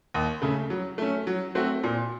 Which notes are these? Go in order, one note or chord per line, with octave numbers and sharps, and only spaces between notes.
D#2
C#3 A3
F#3
A3 C#4
F#3
A3 C4 F#4
A#2